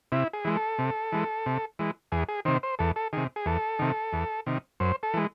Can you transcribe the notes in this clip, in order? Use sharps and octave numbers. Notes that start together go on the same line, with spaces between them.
C3 E4
G#4
E3 G#3
A4
C3
E3 G#3
C3
E3 G#3
E2 G#4
G#4
C3 D#3 C5
C5
E2 A4
A4
C3 D#3 G#4
G#4
E2 A4
C3 D#3
E2
C3 D#3
F#2 C5
A4
E3 G#3